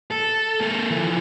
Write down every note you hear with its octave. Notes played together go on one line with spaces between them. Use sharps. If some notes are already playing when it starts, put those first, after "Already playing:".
A4
A#3 A4
E3 F3